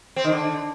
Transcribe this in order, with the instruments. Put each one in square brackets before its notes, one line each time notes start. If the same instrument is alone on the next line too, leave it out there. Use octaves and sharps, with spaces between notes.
[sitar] C4
D#3
D3